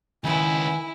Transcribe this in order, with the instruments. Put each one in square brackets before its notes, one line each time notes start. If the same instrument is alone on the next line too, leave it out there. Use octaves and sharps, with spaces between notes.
[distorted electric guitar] C#2 B3 [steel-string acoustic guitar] D#3 B4 G5 [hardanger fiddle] E4 [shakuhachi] G#5